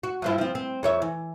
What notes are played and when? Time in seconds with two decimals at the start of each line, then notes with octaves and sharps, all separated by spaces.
0.03 F#4
0.22 G2 F3 E4
0.38 F3 C4
0.55 C4
0.83 F2 C#5 E5
1.02 E3